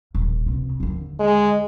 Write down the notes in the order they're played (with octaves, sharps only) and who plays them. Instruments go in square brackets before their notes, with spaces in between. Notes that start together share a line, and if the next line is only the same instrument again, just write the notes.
[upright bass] D#1
C#2 C3
D#2 D3
[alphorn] G#3